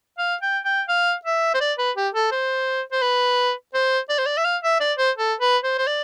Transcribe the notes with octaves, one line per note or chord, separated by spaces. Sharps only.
F5
G5
G5
F5
E5
C5
D5
B4
G4
A4
C5
C5
B4
C5
D5
C5
D5
E5
F5
E5
D5
C5
A4
B4
C5
C5
D5